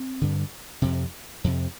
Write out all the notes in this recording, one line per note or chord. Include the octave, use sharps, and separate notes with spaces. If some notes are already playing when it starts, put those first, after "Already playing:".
Already playing: C4
G2 D3
F2 C3
F2 C3